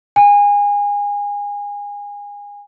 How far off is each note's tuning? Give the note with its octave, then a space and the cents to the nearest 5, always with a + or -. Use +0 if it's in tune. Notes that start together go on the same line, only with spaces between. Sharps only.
G#5 -25